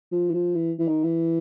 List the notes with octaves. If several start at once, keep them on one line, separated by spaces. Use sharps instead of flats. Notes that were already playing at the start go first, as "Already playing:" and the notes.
F3
E3
F3
E3
E3
D#3
E3